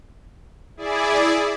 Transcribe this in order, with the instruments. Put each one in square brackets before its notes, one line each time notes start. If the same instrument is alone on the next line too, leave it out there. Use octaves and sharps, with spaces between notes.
[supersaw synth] E4 G#4 D5